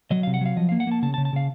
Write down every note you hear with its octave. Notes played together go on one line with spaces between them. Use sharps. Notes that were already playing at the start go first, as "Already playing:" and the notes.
F#3 D#5
C3 F5
F#5
F#3 F5
F3 D#5
A#3 F5
F#5
A#3 A5
C#3 A5
A5
C#3
A5
C#3 F5